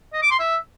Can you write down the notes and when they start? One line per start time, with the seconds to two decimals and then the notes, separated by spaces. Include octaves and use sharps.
0.13 D#5
0.22 D6
0.31 C6
0.39 E5